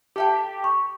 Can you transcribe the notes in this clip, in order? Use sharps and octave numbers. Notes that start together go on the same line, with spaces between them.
G4 A4 E5 G5
C#6